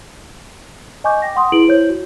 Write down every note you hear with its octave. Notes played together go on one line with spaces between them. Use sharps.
D#5 G#5 C#6 D6 G6
G5 A#6
F#5 C6 D#6
E4 G#4 B4 D7 F#7
E4 C5 C#5 G6
F#4